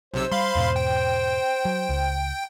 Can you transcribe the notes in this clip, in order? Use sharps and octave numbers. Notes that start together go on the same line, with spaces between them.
B1 C3 C5 E6
G3 F5 B5 C6
E2 G#2 B2
G5
F#3
C#2